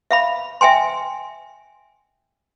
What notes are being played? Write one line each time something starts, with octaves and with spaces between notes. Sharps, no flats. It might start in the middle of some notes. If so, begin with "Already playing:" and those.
E5 F5 B5
E5 G5 G#5 C6